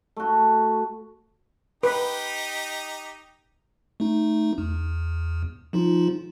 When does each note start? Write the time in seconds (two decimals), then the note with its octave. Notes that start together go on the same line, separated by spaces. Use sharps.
0.16 A3 F#4
1.83 D#4 G4 B4
4.00 A3 D#4
4.58 E2
5.73 F3 D#4 F4